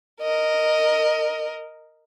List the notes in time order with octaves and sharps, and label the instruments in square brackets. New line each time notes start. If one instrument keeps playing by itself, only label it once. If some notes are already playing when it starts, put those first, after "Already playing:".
[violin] A#4 D#5